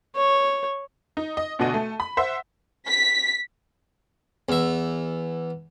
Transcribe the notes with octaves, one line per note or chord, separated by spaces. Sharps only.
C#5
D#4
D#5
D2 B2 D4 F#4 D#5 D#7
A3
B5
C5 E5 F#5 E6 B6
B6
E2 E5